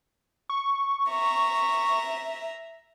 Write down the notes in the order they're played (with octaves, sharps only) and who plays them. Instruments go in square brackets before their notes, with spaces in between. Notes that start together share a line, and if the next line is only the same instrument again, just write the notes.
[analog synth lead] C#6
[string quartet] E5 A#5